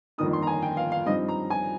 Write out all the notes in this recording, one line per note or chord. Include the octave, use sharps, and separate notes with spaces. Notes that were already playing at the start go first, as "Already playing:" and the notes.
G1 F2 D#3 A#3 D#4 D#6
C6
A#5
G#5
G5
F5
F5
G2 F3 C4 D#4 D#5
A#5
G#5